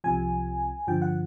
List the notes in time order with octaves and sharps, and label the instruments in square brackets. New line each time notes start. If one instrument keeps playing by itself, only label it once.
[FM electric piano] C2 C3 F3 G#5
G2 D3 F3 G5
F#5